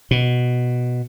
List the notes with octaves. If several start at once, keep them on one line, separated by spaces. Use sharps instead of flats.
B2